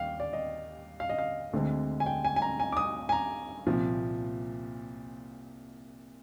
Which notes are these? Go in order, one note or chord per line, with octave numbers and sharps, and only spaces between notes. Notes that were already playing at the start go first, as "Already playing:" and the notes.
Already playing: D#2 F5 G5
D5
D#5
F5
D#5
F5
D2 D3 G#3 C4
G#5
G5
G#5
G#5
A#5
G#5
D6
D#6
G#5
A#5
C2 A#2 F3